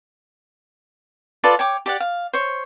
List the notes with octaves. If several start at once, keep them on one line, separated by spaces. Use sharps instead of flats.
F4 A4 B4 D5
C#5 G5 D6
G4 D5 F#5
F5
C5 C#5